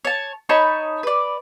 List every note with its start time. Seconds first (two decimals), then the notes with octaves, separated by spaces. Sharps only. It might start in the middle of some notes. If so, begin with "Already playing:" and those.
0.05 C#5 A5
0.49 D#4 C#5 A5 B5
1.03 B4 D5